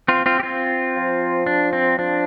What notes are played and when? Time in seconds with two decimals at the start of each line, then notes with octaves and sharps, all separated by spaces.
0.08 C4 F4
0.26 C4 F4
0.40 G4
0.43 C4 F4
0.96 F3
1.46 D4
1.73 C4
1.98 F3 D4